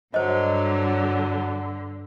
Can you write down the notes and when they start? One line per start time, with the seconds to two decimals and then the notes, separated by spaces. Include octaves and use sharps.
0.14 G2 D3 F#3 C5 D#5